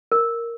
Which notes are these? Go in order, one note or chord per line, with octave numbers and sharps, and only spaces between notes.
A#4